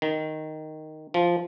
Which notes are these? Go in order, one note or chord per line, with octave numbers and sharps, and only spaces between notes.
D#3
F3